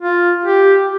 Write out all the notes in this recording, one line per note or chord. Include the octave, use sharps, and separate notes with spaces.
F4
G4